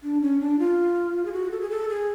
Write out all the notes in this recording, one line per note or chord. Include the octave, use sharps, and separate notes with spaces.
D4
C#4
D4
F4
G#4
F#4
A4
G#4
A4
G#4